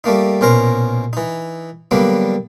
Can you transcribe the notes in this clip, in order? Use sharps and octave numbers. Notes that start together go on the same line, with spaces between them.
G3 A3 A#3 D#4
A#1 B2 C#4 A#4 C5 A#5
E3 D#4
D3 F#3 G3 A#3 B3